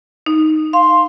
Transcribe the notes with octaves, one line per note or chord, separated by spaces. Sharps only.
D#4
F5 C6